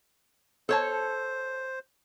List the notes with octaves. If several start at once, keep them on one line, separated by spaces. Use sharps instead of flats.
A4 C5 C#5 A5